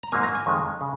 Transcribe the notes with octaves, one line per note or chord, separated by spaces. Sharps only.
A#5
G#2 F#3 A#3 G#5
A#5
G#5
F2 D#3 G#3
C#3